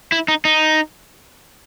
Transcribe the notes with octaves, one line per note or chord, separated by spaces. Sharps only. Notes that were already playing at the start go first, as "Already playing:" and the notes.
E4
D#4
D#4